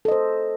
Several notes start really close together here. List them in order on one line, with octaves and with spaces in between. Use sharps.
A4 D#5 C5